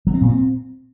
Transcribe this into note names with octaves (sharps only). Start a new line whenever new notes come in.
F#3
C4
A#2
C4